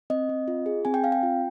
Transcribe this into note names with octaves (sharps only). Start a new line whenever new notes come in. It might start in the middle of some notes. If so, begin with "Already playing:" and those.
C4 D#5
C4
F4
G#4
C4 G#5
G5
C4 F5
G5
F4